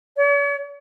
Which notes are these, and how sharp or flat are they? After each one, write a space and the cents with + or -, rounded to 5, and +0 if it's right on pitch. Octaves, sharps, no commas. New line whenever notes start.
C#5 +45